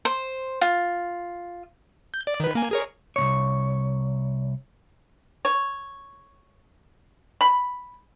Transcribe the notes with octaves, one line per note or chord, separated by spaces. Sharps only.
C5
F4
G6
D5
D#3 B4
A#3 G#5
G#4 A#4 C#5
C2 G#2 C#5
C#5
B5